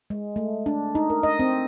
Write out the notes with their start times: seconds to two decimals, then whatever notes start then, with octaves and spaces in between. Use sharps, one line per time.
0.10 G#3
0.36 A3
0.66 D4
0.95 D#4
1.10 A#4
1.23 D#5
1.39 C4